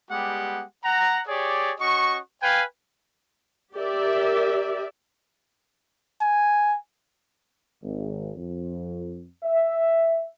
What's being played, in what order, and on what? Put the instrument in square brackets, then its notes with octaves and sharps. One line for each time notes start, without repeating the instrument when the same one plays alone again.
[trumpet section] G3 G#3 B3 G4 F#5
F#5 A#5
G4 G#4 C#5 D5
C#4 F#4 D#5 C#6
B4 F5 G5 G#5
[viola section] G4 A#4 D5 E5
[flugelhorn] G#5
[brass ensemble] G#1
F2
E5